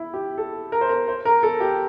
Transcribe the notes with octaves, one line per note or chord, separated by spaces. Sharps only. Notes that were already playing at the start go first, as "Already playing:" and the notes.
Already playing: E4
G4
A4
A#4
C5
A#4
C5
A#4
A4
G4